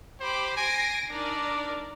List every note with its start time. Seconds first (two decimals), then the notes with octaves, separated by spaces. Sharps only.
0.20 G4 C5 B5 D6
0.56 G#5 A#6 C7 D7
1.10 D4 D#4 A#4 D5